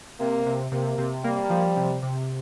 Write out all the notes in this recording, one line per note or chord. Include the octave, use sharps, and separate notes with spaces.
C3 A#3
C3
C3 A#3
C3
G3 A#3
F3
C3
C3